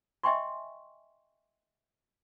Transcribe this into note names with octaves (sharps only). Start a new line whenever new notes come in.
D#5 E5 G5 G#5 C6 C#6